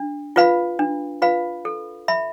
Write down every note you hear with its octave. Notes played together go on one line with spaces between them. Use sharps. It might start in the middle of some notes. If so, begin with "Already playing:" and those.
Already playing: D4
F4 B4 F5 B5
D4
F4 B4 F5 B5
A4
E5 B5